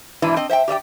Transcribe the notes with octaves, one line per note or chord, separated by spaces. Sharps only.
G#2 B2 E3 D4 E4
C4 D#5
C5 E5 F#5 G5
G4 D5 E5 G5